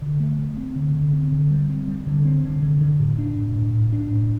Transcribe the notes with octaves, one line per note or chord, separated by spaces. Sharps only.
D3
A3
A3
C4
D3
D3
C4
D3
G3
C4
G3
D3
C4
D3
D3
D3
A2
D4
A2
A2
A2
D4
A2